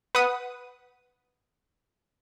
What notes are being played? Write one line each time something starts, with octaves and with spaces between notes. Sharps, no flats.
B4 F#5 D#6